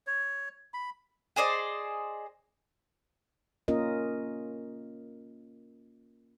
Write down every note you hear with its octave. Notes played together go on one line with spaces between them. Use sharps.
C#5
B5
G#4 C5 D5 D#5
A#3 C#4 F4 A#4 D#5